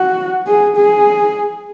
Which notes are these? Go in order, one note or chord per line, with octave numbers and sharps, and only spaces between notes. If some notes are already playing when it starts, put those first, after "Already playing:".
Already playing: F#4
G#4
G#4